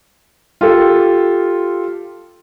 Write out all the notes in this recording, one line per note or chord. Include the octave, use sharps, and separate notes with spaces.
F4 G4 A4